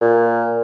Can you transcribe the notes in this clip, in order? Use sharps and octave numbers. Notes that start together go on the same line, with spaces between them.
A#2